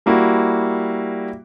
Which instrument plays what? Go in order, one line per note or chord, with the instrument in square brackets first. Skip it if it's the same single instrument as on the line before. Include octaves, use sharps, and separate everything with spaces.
[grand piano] G3 A#3 E4 F#4